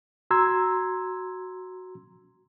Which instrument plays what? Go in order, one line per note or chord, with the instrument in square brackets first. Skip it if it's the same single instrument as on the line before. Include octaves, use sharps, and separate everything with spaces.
[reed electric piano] F#4 A#5 C6 E6 G#6